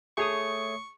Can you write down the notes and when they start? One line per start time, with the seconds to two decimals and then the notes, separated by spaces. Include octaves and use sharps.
0.17 A3 G#4 C#5 C#6 D#6